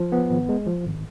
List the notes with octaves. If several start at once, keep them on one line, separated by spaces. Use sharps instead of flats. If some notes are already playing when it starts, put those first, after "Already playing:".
Already playing: F3
B3
G#1
G#3
F3
G#1